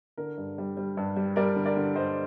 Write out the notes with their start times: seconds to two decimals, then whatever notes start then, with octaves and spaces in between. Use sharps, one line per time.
0.17 D3 A#4
0.38 G2
0.58 G3
0.77 G3
0.97 G2
1.16 G3
1.36 G3 A#4 D5
1.56 D3
1.66 A#4 D5
1.77 D3
1.96 G2 C5 D#5